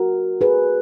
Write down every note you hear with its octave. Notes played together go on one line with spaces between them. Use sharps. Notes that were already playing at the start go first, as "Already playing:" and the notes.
Already playing: F#4 A#4
G#4 B4